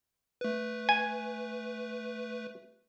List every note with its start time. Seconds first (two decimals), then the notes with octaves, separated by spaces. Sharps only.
0.41 A3 B4
0.89 G#5